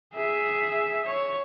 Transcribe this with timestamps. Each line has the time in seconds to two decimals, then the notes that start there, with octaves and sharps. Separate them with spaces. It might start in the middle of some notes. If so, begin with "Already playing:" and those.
0.14 G#4 E5
1.06 C#5